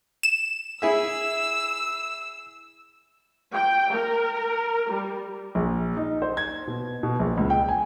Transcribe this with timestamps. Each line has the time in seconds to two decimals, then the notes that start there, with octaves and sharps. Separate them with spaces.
0.23 E7
0.82 E4 G#4 E5 E6
3.53 G5
3.93 A#4
4.91 G3
5.55 A#1
5.97 D#4
6.22 C5
6.37 G#6
6.67 B2
7.03 B2
7.19 A#1
7.37 C#2
7.50 G5
7.69 G#5